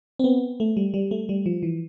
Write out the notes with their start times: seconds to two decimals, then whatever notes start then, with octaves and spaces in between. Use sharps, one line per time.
0.19 C4
0.24 B3
0.60 A3
0.77 G3
0.94 G3
1.11 A3
1.29 G3
1.46 F3
1.63 E3